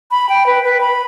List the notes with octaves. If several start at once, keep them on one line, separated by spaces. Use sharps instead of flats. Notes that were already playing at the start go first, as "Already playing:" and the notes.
B5
G5
B4
B4
B5